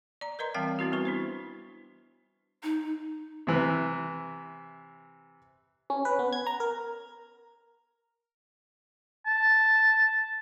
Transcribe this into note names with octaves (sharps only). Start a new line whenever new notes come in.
D5 A#5
A#4 B4 D#5 A#5 C6
E3 G3 C4 F5 G5 A5
B3 C4 E4 F#4
G3 B3 F#4 B4 C#6
D4 E4 C5
D#4
C3 E3
C#4
B4
B3
G#6
A#5
A#4
A5